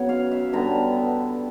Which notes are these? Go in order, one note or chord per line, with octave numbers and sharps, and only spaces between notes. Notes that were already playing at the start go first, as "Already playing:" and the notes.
Already playing: C#3 F#3 B3 C#5
F5
E5
G2 D3 G3 B3 A#5